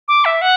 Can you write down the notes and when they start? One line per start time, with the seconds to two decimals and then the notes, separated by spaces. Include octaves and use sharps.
0.08 D6
0.25 E5
0.42 F#5